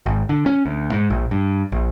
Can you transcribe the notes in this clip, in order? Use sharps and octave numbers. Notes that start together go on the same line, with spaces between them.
G#1
D3
C#4
D2
G#2
A#1
G2
A#1